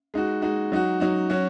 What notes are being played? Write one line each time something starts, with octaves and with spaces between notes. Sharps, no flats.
G#3 D#4 F#4
G#3 D#4 F#4
F#3 D#4 F#4
F#3 D#4 F#4
F#3 C#4 F#4